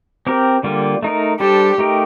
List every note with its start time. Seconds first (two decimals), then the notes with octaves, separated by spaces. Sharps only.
0.27 C4 G4 A#4
0.63 D3 G3 A#3 F4
1.03 A3 D#4 A#4
1.40 G3 D4 G4 A4 C5
1.78 A3 D#4 G4 A#4